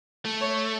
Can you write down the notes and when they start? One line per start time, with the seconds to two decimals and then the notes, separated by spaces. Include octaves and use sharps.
0.25 A3
0.41 C#5